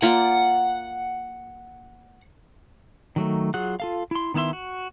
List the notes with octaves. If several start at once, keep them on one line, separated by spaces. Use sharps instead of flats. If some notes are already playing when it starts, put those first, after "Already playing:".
A#3 F4 D5 F#5
D#3 F#3 A3
F#3 F4 G#4 F#5 F#6
F4 A4 F5
E4 C6
D#3 B3 E4 E5 C6
F#4